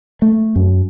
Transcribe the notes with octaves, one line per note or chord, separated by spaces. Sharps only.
A3
F#2